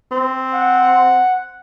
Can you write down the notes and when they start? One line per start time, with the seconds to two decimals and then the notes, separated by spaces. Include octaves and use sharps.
0.11 C4
0.54 F#5